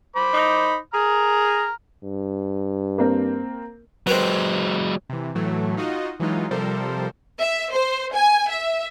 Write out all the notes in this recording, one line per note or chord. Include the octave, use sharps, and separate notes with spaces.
C5 B5 D6
D#4
G#4 A#5 F6
G2
A#3 C4 A#4
F#3 G#3 C4 A#4 B4
C3 E3
A2 E3 F#3 A3
D#4 F4 F#4 D#5
E3 F#3 G#3 D#4 F4
C3 F3 G3 A4 A#4 C5
E5
C5
G#5
E5